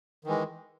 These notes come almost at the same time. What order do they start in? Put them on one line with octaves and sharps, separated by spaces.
D#3 E3 G#3